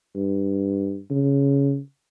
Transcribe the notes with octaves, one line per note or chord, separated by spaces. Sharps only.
G2
C#3